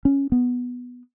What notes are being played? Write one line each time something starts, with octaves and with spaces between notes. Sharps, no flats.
C#4
B3